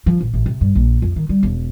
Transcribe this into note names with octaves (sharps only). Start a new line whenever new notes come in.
F3
A1
A1
C3
G2
A#1
F2
D#3
G3
E1